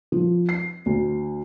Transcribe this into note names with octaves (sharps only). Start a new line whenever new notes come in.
F3
C7
D2